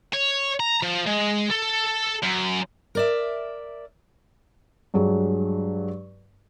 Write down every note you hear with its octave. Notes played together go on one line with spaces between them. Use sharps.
C#5
A#5
F3
G#3
A4
F#2
A#4 D5 E5
G2 F#3 G#3 D4